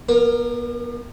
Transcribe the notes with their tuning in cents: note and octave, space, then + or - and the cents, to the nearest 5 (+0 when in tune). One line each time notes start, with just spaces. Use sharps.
B3 -40 A#4 +0